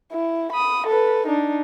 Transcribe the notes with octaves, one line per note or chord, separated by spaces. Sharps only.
E4
B5 D#6
A4 B4
D4 D#4